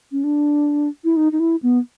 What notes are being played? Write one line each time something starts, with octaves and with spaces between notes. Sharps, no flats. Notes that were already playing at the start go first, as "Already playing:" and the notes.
C#4
D4
E4
D#4
D#4
E4
B3